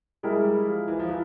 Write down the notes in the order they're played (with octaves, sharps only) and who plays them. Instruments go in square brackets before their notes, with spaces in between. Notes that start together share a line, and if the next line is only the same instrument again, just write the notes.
[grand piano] G3 [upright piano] G#3 E4 A#4
[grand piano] G3
F3
E3
F3
E3